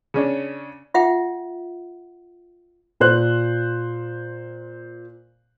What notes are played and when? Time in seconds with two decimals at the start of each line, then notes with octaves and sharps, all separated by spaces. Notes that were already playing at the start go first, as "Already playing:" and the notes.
0.14 C#3 C#4 D4
0.94 F4 E5 F#5 G5
3.00 A#2 C5 F#6